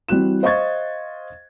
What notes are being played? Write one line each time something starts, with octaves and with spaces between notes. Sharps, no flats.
E3 G3 C4 F#4 F#6 E7
C5 D#5 F5 C#6 G#6 A6